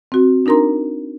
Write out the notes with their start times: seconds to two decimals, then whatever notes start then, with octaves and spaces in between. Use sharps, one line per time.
0.12 C4 F#4
0.46 D4 D#4 A#4 A#5 C6